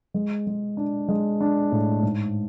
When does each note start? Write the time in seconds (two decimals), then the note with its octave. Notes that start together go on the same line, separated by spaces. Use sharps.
0.14 G#3
0.47 G#3
0.77 D4
1.08 G#3
1.41 D4
1.72 A2
2.03 G#2